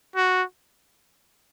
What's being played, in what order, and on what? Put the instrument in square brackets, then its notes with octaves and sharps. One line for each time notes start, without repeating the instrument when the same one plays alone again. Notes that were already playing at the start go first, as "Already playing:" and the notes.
[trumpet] F#4